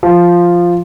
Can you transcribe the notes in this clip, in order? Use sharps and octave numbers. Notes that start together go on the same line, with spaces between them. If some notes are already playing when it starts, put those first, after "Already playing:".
F3